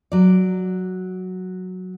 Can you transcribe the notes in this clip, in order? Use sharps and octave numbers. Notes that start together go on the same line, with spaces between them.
F#3 D5